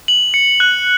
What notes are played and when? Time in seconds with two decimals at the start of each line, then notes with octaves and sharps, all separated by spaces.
0.08 F#7
0.34 C#7
0.60 F#6